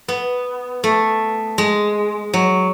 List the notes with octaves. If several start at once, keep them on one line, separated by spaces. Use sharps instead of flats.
B3
A3
G#3
F#3